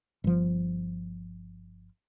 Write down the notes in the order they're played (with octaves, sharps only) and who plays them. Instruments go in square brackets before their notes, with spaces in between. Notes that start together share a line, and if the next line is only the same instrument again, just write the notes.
[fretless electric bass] G1 F3